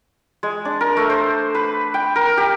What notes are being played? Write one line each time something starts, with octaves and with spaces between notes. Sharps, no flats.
G#3
D4
A#4
A3
C5
B4
G5
A#4
G4